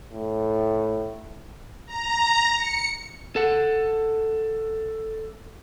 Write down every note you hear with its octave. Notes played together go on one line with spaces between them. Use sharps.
A2
A#5
C#7
A4 F#5